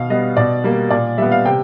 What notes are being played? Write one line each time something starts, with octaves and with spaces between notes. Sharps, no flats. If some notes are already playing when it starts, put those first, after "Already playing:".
Already playing: B2 F5
G3 B3 D#5
B2 D5
G3 A#3
A#2 D5
G3 B3 E5
F5
C3 G5